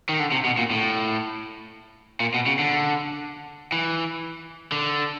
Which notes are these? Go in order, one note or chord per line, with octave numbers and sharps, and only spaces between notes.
D#3
D3
C3
B2
A#2
A2
A#2
B2
C#3
D3
E3
D3